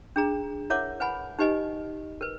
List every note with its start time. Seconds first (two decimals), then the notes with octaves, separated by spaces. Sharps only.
0.16 D4 G#4 A#5
0.70 E4 A#4 C#5 E5 F#5 D6
1.00 B4 F#5 G#5 B5
1.39 D#4 G4 B4 D#5 G#5
2.21 A#4 B4